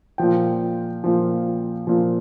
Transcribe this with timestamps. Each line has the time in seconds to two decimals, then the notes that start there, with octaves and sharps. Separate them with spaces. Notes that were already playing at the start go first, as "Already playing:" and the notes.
0.18 A#2 F3 G5
1.04 A#2 F3
1.87 A#2 F3